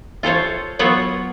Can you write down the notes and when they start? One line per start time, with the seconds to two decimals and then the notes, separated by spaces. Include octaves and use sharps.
0.23 F4 A4 C5 C#5
0.79 F#3 B3 F4 C#5